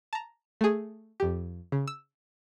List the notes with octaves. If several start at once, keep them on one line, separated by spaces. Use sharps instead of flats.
A5 A#5
A3 G#4
F2 G4
C#3
E6